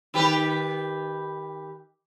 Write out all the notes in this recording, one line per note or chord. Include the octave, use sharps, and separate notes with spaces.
D#3 G4 B4